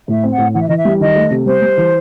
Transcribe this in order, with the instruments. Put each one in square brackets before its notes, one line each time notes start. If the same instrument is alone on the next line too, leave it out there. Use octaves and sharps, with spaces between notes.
[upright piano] A2 [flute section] E5
[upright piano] C4
[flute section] F#5
[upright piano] A2
[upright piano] E3 [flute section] F#5
[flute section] E5
[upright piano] E3 [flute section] D#5
[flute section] E5
[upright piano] G3
[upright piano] D#3 [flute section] D#5
[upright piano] A3
C3
[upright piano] G3 [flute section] C5
[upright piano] G3
E3